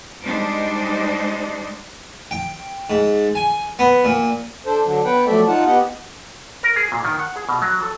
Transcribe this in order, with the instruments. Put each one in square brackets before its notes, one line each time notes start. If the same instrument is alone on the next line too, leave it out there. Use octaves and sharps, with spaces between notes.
[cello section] G3 G#3 D4 D#4 C5
[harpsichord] G5
G#2
G#5
B3
A#2
[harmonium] D4 A4 C5
D3 F#3 D4
B3 B4 F#5 G5
F3 F#3 A3 A4 D5 E5
D#4 F4 F#5 A5
B3 G4 D#5 F#5
[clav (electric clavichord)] A#4
G#4
A#2
D#3
F#5
G#4
B2
F#3
A4